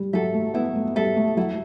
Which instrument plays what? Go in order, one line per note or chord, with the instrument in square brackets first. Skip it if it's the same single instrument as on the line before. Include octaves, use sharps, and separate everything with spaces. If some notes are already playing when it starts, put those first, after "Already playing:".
Already playing: [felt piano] G3
[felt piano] F#3 [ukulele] A4 E5
[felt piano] A3
[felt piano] B3 [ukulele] E4
[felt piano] A3
[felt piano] G3 [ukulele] A4 E5
[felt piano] A3
[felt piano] F#3 [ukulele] E4